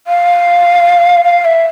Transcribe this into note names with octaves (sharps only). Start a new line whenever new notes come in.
F5
F5
E5